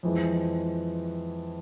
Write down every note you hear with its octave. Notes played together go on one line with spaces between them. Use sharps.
F2 E3 G#3